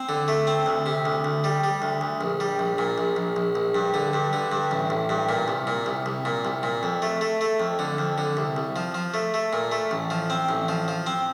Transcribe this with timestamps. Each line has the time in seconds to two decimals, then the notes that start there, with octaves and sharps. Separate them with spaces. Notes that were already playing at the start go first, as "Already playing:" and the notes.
Already playing: C4
0.09 D3
0.28 A3
0.47 C4
0.66 D2
0.86 C3
1.05 D2
1.25 D2
1.44 G3
1.64 G3
1.82 D2
2.01 D2
2.21 A#1
2.40 G3
2.59 A#1
2.78 A#2
2.98 A#1
3.16 A#1
3.36 A#1
3.55 A#1
3.75 G2
3.94 D3
4.13 G2
4.33 D3
4.52 G2
4.71 A1
4.90 A1
5.09 G2
5.29 A#2
5.48 C2
5.67 A#2
5.86 C2
6.06 C2
6.25 A#2
6.45 C2
6.63 A#2
6.83 F2
7.02 A3
7.21 A3
7.41 A3
7.60 F2
7.79 D3
7.98 F2
8.18 D3
8.37 C2
8.56 C2
8.76 F3
8.95 F3
9.14 A3
9.34 A3
9.53 A#2
9.72 A3
9.91 A1
10.10 F3
10.30 C4
10.49 A1
10.68 F3
10.88 F3
11.06 C4